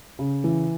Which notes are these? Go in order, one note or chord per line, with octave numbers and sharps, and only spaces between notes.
C#3
E3